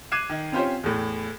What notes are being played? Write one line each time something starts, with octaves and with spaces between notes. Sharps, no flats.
D6 F#6 G#6 C7 D#7 E7
D#3
C4 C#4 F4 G4 C5 C#5
E2 A2